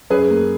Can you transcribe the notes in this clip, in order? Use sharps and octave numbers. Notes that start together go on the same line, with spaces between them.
F#2 G#4 B4
A#3